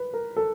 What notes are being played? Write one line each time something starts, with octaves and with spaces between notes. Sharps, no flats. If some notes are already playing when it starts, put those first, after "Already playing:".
Already playing: B4
A#4
A4